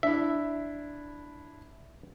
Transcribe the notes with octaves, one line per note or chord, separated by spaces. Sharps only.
D4 E4 E5